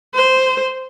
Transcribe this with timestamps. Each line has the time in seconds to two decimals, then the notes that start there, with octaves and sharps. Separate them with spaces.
0.15 C5